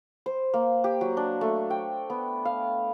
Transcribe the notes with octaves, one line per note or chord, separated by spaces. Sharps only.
C5
A#3
G4
F#3
D4
A3
G5
B3
F5